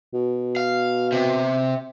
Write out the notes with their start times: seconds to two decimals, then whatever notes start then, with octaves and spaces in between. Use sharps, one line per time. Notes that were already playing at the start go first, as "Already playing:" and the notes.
0.14 B2
0.56 F5
1.12 C3